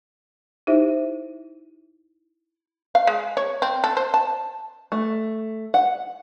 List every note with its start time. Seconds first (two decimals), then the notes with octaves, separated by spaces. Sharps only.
0.67 D#4 E4 G4 C5 E5
2.95 F5
3.07 G#3
3.37 C#5
3.62 C4
3.84 A4
3.97 C5
4.14 A5
4.92 A3
5.74 F#5